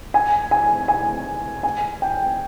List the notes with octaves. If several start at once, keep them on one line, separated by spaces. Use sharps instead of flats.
G#5
G#5
G#5
G#5
G5